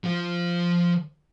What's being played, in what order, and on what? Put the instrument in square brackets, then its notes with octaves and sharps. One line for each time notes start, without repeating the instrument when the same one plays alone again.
[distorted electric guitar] F3 F4